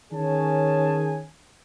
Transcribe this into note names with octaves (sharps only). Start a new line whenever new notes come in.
D#3 C#4 G#4 C#5 G#5 A5